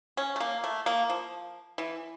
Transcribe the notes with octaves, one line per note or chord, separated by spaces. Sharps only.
C#4
A3
A#3
A3
A#3
F3
E3